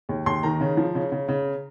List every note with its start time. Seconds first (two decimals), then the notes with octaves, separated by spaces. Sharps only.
0.09 D#2
0.26 D#2 C6
0.43 D#3 A#5
0.61 C#3
0.77 F3
0.95 C#3
1.12 C#3
1.28 C#3